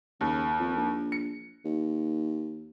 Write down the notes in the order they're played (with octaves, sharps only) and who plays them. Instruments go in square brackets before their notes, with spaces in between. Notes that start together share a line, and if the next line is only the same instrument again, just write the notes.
[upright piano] D#2 [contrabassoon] C#3
[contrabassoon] F2
A#1
[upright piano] C#7
[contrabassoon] D#2